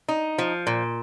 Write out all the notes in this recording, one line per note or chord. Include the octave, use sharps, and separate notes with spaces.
D#4
F3
A#2